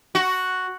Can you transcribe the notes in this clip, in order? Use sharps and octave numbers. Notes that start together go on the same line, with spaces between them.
F#4